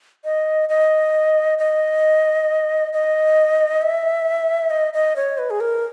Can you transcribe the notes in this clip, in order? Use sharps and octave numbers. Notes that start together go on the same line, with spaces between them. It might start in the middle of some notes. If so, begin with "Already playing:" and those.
D#5
D#5
D#5
D#5
E5
D#5
D#5
C#5
B4
G#4
A#4